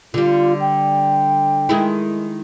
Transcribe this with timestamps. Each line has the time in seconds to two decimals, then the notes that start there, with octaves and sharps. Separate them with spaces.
0.14 D3 G3 F4
0.60 G5
1.69 D#3 G#3 E4